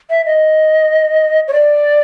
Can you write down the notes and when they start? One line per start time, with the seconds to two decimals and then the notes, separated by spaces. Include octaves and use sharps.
0.10 E5
0.26 D#5
1.48 C#5
1.53 D5